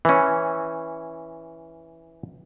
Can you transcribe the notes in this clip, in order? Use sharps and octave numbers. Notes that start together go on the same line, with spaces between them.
E3 C#4